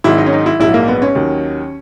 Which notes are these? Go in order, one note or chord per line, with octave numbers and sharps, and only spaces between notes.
G#1 G#2 D#3 F#3 E4
D#4
C#4
D#4
E4
A#1 G#2 F#3 E4
A#3
B3
C#4
D#2 D#3 F#3